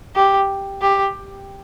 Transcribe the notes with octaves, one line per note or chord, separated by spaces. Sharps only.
G4
G4